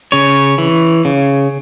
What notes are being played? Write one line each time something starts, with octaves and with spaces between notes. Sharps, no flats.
C#3 C#5
E3
C#3